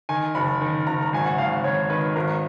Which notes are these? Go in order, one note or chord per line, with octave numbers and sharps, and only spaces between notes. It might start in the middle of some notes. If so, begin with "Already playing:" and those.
D#3 G#5
F#1 B5
D#3
F#1 A#5
A#5
G#1 G#5
F#5
G#1 F5
G#1 C#5
D#3 B4
G#1 A#4